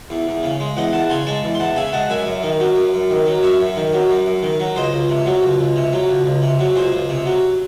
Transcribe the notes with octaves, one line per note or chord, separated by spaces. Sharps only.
E2
E2
C#3
G#3
E2 D#5 F#5
E2 F#5 A5
C#3 G#5 C6
G#3 A5 C#6
E2
C6
E2 F#5 A5
C#3 E5 G#5
G#3 F#5 A5
F#2 E5 G#5
F#2
D#3
F#3
F#2
F#2
D#3
F#3
F#2 C#5 E5
F#2
D#3
F#3
F#2
F#2
D#3
F#3
C#2 C5 D#5
C#2
C3
F#3
C#2
C#2
C3
F#3
C#2
C#2
C3
F#3
C#2 G#4 C5
C#2
C3
F#3